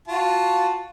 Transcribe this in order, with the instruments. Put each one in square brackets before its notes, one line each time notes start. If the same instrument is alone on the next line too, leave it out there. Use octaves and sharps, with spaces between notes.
[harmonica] F4 F#4 A5